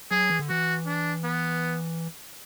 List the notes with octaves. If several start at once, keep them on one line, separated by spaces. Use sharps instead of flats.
F#3 G#4
E3
D3
E3 F#4
D4
B3